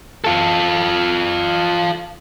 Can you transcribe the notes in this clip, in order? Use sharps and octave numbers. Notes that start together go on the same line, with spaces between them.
F4 A4